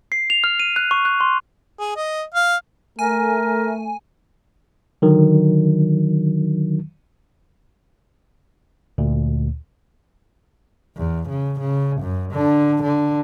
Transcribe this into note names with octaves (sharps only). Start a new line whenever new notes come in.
C7
F7
F6
D#7
F#6
C#6
F#6
C6
G#4
D#5
F5
A3 A#4 G#5
D3 D#3 F#3
D2 A#2
E2
C#3
C#3
F#2
D3
D3